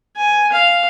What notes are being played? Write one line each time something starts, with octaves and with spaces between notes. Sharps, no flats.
G#5
F5